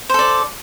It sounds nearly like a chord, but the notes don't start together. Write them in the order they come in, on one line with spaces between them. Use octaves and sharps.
C5 A4 D5